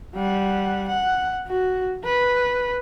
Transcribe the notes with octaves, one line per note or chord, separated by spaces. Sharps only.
G3 F#5
F#5
F#4
B4